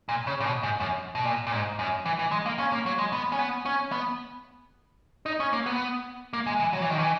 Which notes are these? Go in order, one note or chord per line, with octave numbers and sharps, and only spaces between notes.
A#2
C#3
A#2
B2
G#2
F#2
B2
A#2
A#2
G#2
F#2
E3
E3
G#3
A#3
C#4
A#3
F#3
G#3
B3
C#4
B3
C#4
B3
D#4
C#4
A#3
B3
A#3
G#3
E3
F#3
E3
D#3
E3